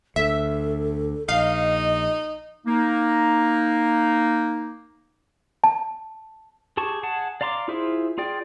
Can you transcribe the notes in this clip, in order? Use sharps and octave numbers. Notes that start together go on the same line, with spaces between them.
D2 A4 E5
A#1 D#4 D#5 F5
A#3 D#4
A5
G4 G#4 A5 C#6
G#4 F#5 A5
D5 F5 A#5 C6 D6
E4 F4 G#4 C5 E5
F4 G#4 D5 G5